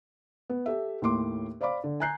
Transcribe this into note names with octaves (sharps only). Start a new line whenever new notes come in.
B3
G4 A4 E5
D#2 A2 C6 D6
C5 D5 F5 B5 D6
D3
G#5 A#5 F#6 G6 C7